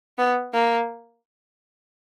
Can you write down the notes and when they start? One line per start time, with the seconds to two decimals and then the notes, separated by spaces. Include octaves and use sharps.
0.18 B3
0.53 A#3